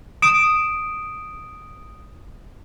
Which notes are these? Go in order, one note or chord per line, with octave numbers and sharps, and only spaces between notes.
D#6 D7 E7